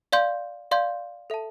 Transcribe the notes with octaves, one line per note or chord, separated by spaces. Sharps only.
D5 F5 C6 G6
D5 F5 C6 G6
A4 E5 A5